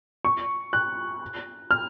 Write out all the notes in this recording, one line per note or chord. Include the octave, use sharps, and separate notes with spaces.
C#6
F#6
F6